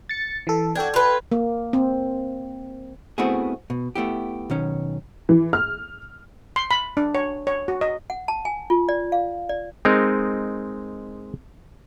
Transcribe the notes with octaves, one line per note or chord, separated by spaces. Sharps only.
A6 C#7
E3 A4
D4 F#4 A4 G5 G#6
F4 B4
A#3
C4
A3 B3 C4 E4 F#4 G#4
B2
A3 B3 E4 G4
B1 D#3 C#4
E3
F6
C6
B5
D4
C#5
C#5
F#4
D#5
F#5
A5
G#5
F4
D5
F5
D5
G#3 C4 D#4 A#4